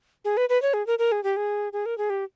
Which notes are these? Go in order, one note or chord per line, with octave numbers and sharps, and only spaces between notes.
G#4
B4
B4
C#5
G#4
A#4
A#4
G#4
G4
G#4
G#4
A#4
G#4
G4